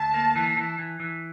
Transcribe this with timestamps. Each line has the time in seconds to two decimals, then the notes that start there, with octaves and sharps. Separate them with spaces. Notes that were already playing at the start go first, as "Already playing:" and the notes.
Already playing: D2 A5
0.14 A#3
0.36 E3
0.57 E3
0.79 E3
1.00 E3